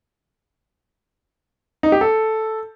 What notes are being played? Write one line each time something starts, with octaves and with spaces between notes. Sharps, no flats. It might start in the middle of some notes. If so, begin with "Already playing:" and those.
D#4
G4
A4